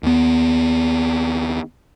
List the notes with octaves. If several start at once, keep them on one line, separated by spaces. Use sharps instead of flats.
D#2 B3